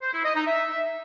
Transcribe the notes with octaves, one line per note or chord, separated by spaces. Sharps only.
C5
E4
D#5
D#4
E5